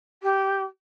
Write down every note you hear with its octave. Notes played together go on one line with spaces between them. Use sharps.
G4